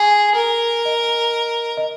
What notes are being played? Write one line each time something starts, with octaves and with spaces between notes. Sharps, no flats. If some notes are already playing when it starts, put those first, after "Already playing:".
Already playing: G#4 G#5 C#6
A#4
D#5
D#5